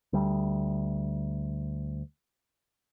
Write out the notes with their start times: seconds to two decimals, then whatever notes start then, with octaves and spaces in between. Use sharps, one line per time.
0.13 D2 G3